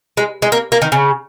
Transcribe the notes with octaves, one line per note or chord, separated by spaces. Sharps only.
G#3
G#3
A#3
A#3
D#3
C#3